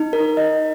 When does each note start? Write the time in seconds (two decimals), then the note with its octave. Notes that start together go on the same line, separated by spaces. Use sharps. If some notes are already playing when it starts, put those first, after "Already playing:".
Already playing: D#4
0.13 A#4
0.37 D#5